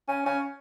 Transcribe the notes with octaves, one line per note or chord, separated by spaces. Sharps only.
C#4
C#4